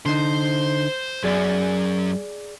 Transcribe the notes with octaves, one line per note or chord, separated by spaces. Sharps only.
D3 D#4 C5
F#2 G#4 D5